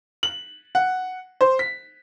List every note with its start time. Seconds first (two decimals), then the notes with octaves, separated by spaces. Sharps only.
0.23 F#7
0.75 F#5
1.41 C5
1.59 B6